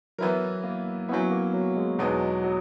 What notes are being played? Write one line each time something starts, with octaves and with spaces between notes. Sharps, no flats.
E3 F#3 B3 E4 A#4
A#3
F#3 B3 C#4 E4
A#3
F#3
G#3
E2 B2 F#3 G#3 B3 D#4
F#3